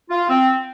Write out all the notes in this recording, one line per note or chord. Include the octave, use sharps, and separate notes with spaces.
F4
C4